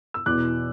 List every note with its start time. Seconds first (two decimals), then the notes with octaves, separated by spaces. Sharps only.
0.14 E6
0.26 E2 B2 D6 F#6